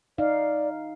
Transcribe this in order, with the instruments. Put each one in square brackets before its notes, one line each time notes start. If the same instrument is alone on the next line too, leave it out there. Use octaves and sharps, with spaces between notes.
[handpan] D#4 F5 [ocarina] D5